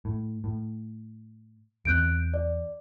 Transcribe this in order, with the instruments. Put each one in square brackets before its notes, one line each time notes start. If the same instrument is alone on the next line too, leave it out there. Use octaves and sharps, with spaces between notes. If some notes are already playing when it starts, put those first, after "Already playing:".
[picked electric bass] A2
A2
[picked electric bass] E2 E3 C4 [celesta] F#6 G6 D7
[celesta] D5